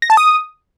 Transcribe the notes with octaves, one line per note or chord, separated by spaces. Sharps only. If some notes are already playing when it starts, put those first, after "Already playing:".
A#6
A5
D#6